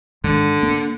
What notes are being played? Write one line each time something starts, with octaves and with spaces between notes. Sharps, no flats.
G#2 D3 D#3 G#3
A#3